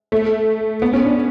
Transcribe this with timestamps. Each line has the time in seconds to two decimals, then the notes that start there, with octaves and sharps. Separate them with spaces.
0.12 A3
0.82 B3
0.93 C#4
1.05 D4